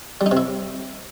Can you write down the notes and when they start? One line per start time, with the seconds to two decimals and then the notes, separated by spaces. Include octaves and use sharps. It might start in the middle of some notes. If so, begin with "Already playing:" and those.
0.21 G3
0.26 D#4
0.31 C3
0.37 E4